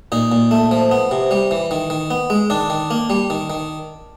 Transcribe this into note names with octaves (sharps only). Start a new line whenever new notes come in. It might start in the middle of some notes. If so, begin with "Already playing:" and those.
A#2 D#4
A#2
A3
F3
B3
C3
G3
E3
D#3
D#3
B3
G#3
D#3 D4
D#3
A#3
G3
D#3
D#3